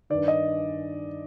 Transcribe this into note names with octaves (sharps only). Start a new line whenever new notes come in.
G2 D#3 D5
D#5